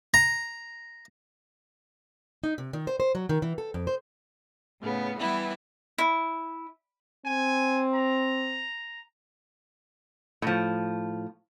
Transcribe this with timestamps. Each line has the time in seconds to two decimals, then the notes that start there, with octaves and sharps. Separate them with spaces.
0.14 A#5
2.44 D#4
2.58 C3
2.73 D#3
2.87 C5
3.00 C5
3.15 F#3
3.29 D#3
3.42 E3
3.58 A4
3.74 F2
3.87 C5
4.80 A2 C#3 B3
5.18 E3 G3 B3 E4
5.98 E4
7.25 C4 G#5
7.94 A#5
10.42 A2 F3